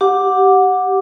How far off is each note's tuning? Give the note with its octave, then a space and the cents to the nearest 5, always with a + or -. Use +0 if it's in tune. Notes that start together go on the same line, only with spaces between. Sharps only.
G4 -10 F#5 -15 D6 +0